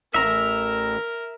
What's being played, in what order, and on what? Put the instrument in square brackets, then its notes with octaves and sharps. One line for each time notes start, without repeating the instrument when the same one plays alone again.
[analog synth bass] A1 [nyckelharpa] A#4 [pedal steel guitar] E5 A#5